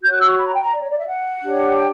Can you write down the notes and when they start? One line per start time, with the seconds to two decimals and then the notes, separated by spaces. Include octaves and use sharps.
0.02 F#4 C#5 G6
0.12 F#6
0.20 E6
0.29 C#6
0.38 B5
0.46 A#5
0.55 G5
0.64 A#5
0.73 D5
0.81 C#5
0.90 D5
0.99 E5
1.07 F#5
1.42 D4 G4 C#5
1.77 G5